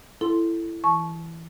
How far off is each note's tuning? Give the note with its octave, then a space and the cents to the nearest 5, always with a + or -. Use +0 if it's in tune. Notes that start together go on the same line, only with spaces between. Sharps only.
E4 +20 A4 +0 C6 +0
E3 +0 A5 -30 C#6 +0